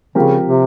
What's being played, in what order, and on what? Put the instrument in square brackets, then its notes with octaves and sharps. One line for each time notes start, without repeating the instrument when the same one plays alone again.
[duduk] C#3 [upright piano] F3 C4 G4 A#4
[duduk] C3